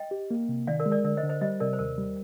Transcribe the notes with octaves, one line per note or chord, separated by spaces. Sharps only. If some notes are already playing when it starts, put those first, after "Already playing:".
Already playing: D#5 G5
G4
A#3
C3
D#3 D5 F5
A#4 D5
G#3
A#4 D5
D3 A#4 D5
C5 D#5
D3
C5 D#5
G3 C5 D#5
C3 A#4 D5
C5
D#2 A#4
G3